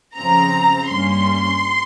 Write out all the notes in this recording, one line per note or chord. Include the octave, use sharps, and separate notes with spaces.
F2 C#3 F3 C4 A#5
G2 G3 A#3 C#4 C6